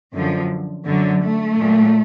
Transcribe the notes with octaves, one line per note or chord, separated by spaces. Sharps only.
F#2 D3 F3
F#2 D3 F#3
A3
A#2 F#3